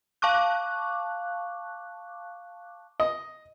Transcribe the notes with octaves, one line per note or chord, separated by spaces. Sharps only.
F5 A5 C#6 D6 F#6
D#5